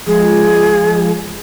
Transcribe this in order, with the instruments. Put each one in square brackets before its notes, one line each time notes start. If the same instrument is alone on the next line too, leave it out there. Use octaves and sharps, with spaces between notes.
[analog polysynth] F3 G#3 F4 [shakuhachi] G#4